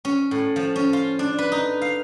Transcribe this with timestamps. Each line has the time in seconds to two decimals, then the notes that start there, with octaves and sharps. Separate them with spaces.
0.05 C#4
0.31 A2
0.56 F3
0.76 C#4
0.93 F4
1.19 D4
1.38 B4
1.52 D#4
1.82 F5